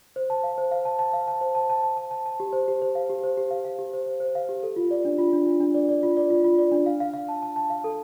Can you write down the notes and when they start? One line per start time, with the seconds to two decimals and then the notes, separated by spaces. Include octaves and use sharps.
0.16 C5
0.30 A5
0.43 F5
0.58 C5
0.71 F5
0.85 A5
0.99 A5
1.13 F5
1.28 A5
1.41 C5
1.55 A5
1.70 A5
1.83 A5
1.97 A5
2.11 A5
2.26 A5
2.40 G4
2.53 C5
2.68 G4
2.82 C5
2.95 F5
3.10 G4
3.24 C5
3.37 G4
3.51 F5
3.65 F5
3.79 G4
3.93 C5
4.07 C5
4.20 C5
4.35 F5
4.49 G4
4.63 A4
4.76 F4
4.91 D5
5.05 D4
5.19 F4
5.33 D4
5.46 F4
5.60 D4
5.74 D5
5.89 D5
6.03 F4
6.17 D5
6.30 F4
6.44 F4
6.58 D5
6.72 D4
6.86 F5
7.00 F5
7.14 F5
7.29 A5
7.42 A5
7.56 A5
7.70 F5
7.84 A4